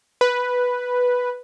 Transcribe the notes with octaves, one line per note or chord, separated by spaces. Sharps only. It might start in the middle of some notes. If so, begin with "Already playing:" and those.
B4